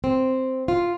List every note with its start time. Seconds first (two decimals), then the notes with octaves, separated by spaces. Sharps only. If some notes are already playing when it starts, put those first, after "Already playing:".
0.04 C4
0.68 F4